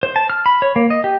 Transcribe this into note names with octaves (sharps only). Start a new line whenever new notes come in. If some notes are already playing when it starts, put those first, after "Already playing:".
C5
A5
F6
B5
C#5
A#3
D#5
G4